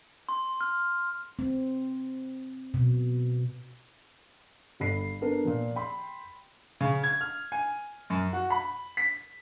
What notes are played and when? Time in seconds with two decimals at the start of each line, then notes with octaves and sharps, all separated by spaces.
0.29 C6
0.61 F6
1.39 C4
2.74 B2
4.80 G1 B5 C7
5.21 B3 D4 A4 A#4
5.44 A#2 F3
5.76 G5 B5 C6
6.81 C#3
7.03 G#6
7.21 F6
7.52 G#5
8.10 F#2
8.33 F#4
8.50 B5
8.97 B6